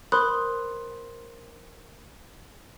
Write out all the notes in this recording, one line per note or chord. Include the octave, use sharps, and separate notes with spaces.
A#4 C5 B5 C6 D#6 F#6